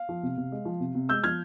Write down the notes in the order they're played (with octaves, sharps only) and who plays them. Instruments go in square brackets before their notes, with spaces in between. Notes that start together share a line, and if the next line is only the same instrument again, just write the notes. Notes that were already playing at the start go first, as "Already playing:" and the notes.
Already playing: [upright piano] F5
F3
C3
C3
G#3
F3
C3
C3
G#3 E6 G6
F3 F6 G#6